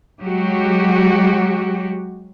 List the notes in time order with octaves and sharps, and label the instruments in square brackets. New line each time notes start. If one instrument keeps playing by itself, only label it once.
[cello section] F#3 G#3 F#4 G4